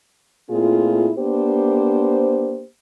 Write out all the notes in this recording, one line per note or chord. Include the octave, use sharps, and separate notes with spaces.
A#2 A3 C4 E4 F4 G#4
A#3 B3 D4 G4 C5